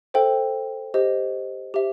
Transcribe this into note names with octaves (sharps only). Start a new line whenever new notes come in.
A4 C5 E5 G5
G4 C5 D#5
G4 C5 E5